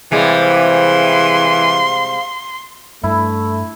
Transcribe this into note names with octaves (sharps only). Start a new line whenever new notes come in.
C3 E3 G3 G#3 F5
C6
G2 A3 E4